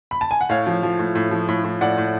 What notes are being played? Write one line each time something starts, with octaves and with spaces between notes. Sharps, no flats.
B5
A5
G#5
F#5
A2 C#5 F5
F3
F3
A2
A2
F3
A2
A2
A2 D5 F#5
A2